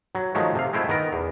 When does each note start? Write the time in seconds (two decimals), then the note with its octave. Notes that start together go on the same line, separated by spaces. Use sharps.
0.15 F#3
0.35 D#3 F3 F#3 G#3 A3
0.55 C3 F5
0.73 G#3 A3 C4 E4 F4
0.89 D#3 B3 A#4
1.13 E2